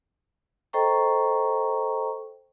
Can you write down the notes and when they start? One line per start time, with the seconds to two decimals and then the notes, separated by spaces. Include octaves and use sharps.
0.73 A4 C5 D#5 G5 A#5 C#6